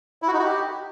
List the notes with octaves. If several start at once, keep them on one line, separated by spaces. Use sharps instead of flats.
E4
F#4
D#4
F#4
G4